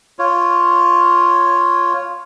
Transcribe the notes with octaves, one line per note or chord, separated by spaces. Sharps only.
F4 C#5